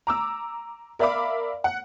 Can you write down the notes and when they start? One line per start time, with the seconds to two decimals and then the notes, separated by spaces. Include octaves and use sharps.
0.07 A#5 D6 E6
0.99 A#4 D5 E5 F5 B5 D6
1.64 F#5